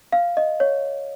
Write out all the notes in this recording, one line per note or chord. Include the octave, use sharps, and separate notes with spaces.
F5
D#5
C#5